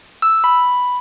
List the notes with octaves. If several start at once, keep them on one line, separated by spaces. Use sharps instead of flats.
E6
B5